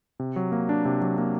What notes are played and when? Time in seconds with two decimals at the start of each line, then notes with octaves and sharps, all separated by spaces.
0.20 C3
0.36 F#3
0.52 A#3
0.69 D4
0.85 C3
1.01 F#3
1.17 A#3